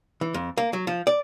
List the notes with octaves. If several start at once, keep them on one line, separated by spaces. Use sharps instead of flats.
E3
F2
A#3
F#3
F3
D5